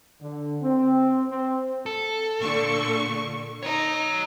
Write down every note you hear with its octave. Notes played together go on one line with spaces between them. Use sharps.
D3
C4
C4
A4
A#2 D3 C#6
D#4 C#5 A#5